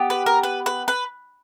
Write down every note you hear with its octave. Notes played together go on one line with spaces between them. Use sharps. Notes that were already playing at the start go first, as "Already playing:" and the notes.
Already playing: B3 G4
B4
A#4
B4
B4
B4